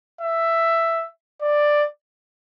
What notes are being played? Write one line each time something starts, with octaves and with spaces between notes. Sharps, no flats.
E5
D5